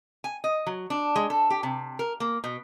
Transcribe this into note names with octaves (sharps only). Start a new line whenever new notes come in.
G#5
D#5
F#3
D4
G#3
A4
G4
C3
A#4
A#3
B2